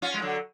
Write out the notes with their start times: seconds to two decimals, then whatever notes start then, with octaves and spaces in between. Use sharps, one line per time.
0.02 C#4 F4
0.14 G#3
0.22 D3 F#3